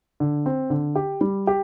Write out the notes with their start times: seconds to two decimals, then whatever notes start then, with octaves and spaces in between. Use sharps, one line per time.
0.20 D3
0.46 C4
0.70 D3
0.95 G4
1.21 G3
1.47 G4